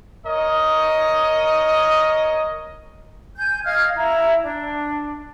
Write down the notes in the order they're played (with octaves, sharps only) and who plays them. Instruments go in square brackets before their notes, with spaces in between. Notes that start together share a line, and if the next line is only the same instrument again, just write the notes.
[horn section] A#4 C#5 D#5
[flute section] G#5 G6
D#5 F5 F6 G#6
E4 A#5
D4